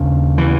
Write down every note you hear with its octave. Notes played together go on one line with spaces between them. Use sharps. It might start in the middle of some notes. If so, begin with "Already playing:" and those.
Already playing: D#2 C#3
E3